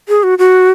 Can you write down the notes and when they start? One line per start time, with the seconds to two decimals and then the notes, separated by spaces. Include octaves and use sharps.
0.09 G#4
0.23 F#4
0.39 F#4